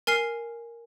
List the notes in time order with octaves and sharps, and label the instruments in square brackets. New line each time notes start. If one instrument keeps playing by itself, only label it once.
[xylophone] A#4 G#5 F6 C7